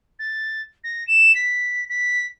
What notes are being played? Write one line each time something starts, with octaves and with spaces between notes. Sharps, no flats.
A6
A#6
E7
B6
B6